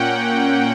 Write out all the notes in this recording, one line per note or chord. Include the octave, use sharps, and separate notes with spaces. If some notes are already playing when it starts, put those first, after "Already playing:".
Already playing: A#2 A#3 C#4 F#5 G5